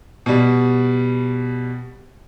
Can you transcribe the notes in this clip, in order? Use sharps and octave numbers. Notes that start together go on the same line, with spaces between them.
B2 G3